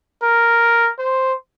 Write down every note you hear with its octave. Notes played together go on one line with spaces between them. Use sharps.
A#4
C5